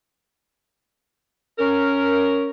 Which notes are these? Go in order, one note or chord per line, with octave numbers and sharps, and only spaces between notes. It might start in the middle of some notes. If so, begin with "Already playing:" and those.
C#4 A#4